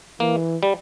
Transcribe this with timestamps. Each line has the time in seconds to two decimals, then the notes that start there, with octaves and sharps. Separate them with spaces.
0.20 E3 A#3
0.63 G3